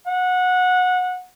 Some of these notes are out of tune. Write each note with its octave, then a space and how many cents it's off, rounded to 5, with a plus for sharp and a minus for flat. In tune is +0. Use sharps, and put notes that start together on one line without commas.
F#5 -20